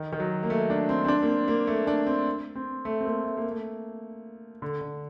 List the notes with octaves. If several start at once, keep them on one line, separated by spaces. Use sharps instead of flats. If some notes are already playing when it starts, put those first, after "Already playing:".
Already playing: D#3
D#3
F#3
A#3
A3
D4
C4
C4
D4
A#3
C4
A#3
A3
D4
C4
C4
A3
C4
A#3
A3
A#3
A3
D3
D3